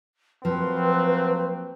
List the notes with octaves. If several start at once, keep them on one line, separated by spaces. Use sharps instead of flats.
F3 F#3 A#3 C4 B4